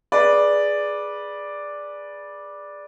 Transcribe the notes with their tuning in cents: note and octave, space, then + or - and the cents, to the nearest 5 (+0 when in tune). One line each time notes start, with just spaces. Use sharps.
G#4 +5 B4 -15 D5 +0